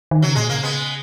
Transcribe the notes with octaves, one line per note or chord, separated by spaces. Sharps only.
D#3
C#3 F#3
A#2 G#3
C#3 A#3
G#3 B3